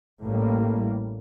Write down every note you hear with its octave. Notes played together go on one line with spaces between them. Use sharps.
A1 A2 G3 A#3